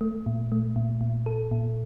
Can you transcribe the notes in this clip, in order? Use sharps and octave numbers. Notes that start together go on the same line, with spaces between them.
A3
A#2
A3
A#2
A#2
A4
A#2